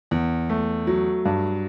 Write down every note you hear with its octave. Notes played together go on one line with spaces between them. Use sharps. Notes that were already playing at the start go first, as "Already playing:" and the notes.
E2
A3
F#3
G2